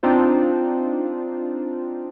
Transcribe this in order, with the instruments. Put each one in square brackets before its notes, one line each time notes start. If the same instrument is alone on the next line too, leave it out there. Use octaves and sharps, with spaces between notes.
[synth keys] C4 D4 D#4 F4 C5